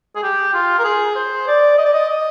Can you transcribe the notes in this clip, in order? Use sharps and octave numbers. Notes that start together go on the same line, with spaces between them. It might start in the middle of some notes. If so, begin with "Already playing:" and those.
G#4
G4
F4
A#4
G#4
C5
D5
D#5
D5
D#5
D#5